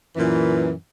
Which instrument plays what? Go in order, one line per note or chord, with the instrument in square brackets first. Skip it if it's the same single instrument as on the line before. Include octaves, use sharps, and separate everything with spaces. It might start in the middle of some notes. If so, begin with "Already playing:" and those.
[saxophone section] F#2 A#2 E3